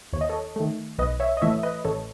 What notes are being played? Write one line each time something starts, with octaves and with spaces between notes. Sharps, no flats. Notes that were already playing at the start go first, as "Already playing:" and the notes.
D#2 C#5
D#5
A4 C#5
D#3 A3
B1 B4 D#5
C#5 E5
D#5
A2 E3 A3 C#5 E5
B4 D#5
A1 A4 C#5